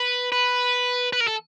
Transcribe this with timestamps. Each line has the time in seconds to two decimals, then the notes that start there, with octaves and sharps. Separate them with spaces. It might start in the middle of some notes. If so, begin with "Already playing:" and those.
Already playing: B4
0.32 B4
1.13 B4
1.20 A#4
1.28 A4